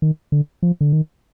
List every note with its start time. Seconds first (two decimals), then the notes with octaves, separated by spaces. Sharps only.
0.02 D#3
0.32 D3
0.63 F3
0.81 D3
0.92 D#3